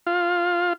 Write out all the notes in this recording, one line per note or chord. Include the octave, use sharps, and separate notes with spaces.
F4